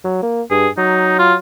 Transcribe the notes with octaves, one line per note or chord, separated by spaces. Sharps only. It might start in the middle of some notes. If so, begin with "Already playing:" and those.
F#3
A#3
G2 G#4
F#3 D#4
F4